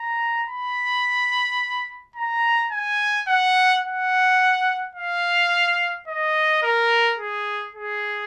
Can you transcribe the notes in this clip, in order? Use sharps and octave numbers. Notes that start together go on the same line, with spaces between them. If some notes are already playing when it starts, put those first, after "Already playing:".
Already playing: A#5
B5
A#5
G#5
F#5
F#5
F5
D#5
A#4
G#4
G#4